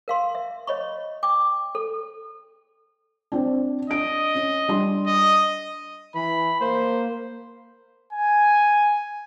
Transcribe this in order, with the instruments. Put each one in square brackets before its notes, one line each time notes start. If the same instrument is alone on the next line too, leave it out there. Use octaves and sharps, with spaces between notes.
[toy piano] A#4 F5 C6
E5
C#5 D#5 B5 C#6
G5 D6
A4
[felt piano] C4 D4
[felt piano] D4 D7 [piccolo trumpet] D#5
[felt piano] C#4
G3 D4 C6
[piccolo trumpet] D#5
[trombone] E3 [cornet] B5
[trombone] A#3 [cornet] C5
[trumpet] G#5